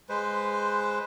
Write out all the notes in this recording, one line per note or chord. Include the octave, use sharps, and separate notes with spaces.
G#3 B4 C5